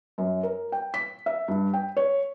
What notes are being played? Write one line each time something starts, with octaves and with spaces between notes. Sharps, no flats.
F#2
A#4
G5
B6
E5
G2
G5
C#5